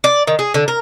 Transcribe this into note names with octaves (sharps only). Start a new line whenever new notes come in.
D5
D#3
G#4
D3
A#4